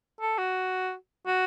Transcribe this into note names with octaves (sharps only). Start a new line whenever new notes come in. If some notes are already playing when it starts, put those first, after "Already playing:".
A4
F#4
F#4